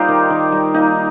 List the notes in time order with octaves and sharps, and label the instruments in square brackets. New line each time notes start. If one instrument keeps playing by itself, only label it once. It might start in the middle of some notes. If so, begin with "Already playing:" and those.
Already playing: [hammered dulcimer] G3 A#3 D#4 F4 G4 A#4 C5
D#3
D#3
G3
A#3 D#4